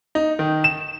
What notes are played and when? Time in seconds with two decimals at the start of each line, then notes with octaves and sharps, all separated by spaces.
0.15 D#4
0.39 D#3
0.64 E7